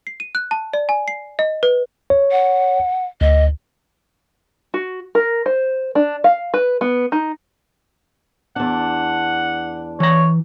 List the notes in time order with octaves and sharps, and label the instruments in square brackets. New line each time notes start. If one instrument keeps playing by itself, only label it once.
[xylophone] C7
D#7
F#6
A5
D5
G#5
C7
D#5
B4
[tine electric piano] C#5
[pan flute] F#5
[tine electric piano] D2 [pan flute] D#5
[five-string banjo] F#4
A#4
C5
D4
F5
B4
B3
D#4
[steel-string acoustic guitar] E2 D4 [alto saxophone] F#5
[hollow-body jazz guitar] E3 A#5 [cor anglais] C#5